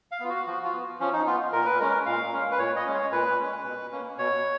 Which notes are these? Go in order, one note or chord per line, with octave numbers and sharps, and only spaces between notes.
F5
B3 F4
F#4
F3 F#4
F4
B3
F3 C#4
D#4
B3 F4
A#2 A#4
B4
G#3 C#4 A#4
A#2 F5
G#3 C#4
B4
A#2 C#5
D#5
G#3 C#4
C#5
A#2 B4
G#3 C#4
B2
A#3 C#4
B2 C#5